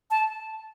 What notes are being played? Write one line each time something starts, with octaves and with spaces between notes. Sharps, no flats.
A5